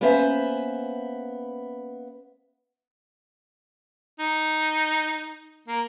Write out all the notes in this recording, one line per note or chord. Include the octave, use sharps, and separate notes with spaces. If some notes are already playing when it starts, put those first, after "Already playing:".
A#3 B3 C#4 B4 C5 E5
D#4
A#3